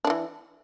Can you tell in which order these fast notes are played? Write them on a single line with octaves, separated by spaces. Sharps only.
D4 D#3 E3